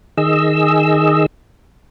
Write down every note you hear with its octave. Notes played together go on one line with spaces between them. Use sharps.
D#3 G#4 D#5 E6